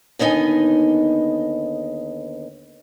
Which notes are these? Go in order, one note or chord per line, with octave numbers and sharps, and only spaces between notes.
D#2 D3 B3 D#4 D#5 G#5